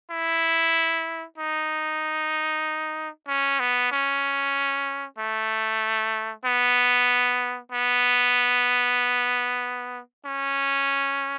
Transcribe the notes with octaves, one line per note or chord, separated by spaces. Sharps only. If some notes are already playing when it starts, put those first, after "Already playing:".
E4
D#4
C#4
B3
C#4
A3
B3
B3
C#4